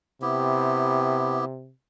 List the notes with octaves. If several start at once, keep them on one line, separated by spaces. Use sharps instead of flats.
C3 B3 E4 G4